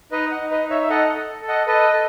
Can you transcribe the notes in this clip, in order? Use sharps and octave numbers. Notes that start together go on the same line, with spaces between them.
D#4 B4 D#5
D#5 F#5
D#4
B4 D#5
D#4
C#5 E5
E5
A4 D#5 F#5
D#5 F#5
A4
A4
D#5 F#5
A4 B4 D#5
A4